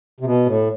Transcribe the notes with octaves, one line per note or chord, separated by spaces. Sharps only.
C3
B2
A2